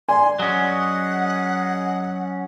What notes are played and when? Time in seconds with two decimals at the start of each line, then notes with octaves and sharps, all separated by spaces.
0.09 D5 G#5 C6
0.39 F#3 C#4 G#4 D#5 F#5